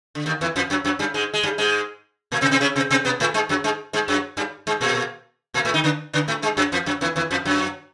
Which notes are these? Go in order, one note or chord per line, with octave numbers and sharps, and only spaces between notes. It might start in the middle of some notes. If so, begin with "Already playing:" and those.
D3
D#2 D#3
E2 E3
F2 F3
F#2 F#3
F#2 F#3
G2 G3
G#2 G#3
G#3
G2 G3
G#2 G#3
A#2 A#3
C3 C4
C3 C4
C#3 C#4
C3 C4
C3 C4
B2 B3
A2 A3
G#2 G#3
F#2 F#3
G#2 G#3
G#2 G#3
F#2 F#3
G2 G3
G#2 G#3
A#2 A#3
A#2 A#3
A2 A3
D#3 D#4
D3 D4
D3 D4
A2 A3
G#2 G#3
F#2 F#3
F2 F3
F#2 F#3
E2 E3
E2 E3
F2 F3
F#2 F#3